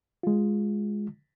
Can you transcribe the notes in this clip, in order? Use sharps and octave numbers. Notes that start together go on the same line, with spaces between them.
G#3 F4